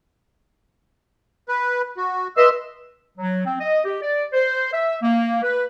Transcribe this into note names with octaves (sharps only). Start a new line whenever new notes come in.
B4
F#4
B4 D#5 E5 C6 E6
F#3
C4
D#5
G4
D5
C5
E5
A#3
B4